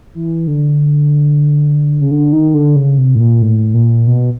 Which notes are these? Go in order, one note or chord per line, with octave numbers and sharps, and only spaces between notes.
E3
D3
C#3
D3
D#3
D3
C#3
C3
A2
A#2
A2
A#2
B2